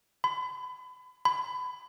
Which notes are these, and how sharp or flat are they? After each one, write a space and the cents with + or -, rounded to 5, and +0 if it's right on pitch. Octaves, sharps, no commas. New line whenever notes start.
B5 +35
B5 +25